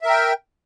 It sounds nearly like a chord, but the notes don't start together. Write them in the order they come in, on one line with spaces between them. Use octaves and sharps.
E5 A#4 G5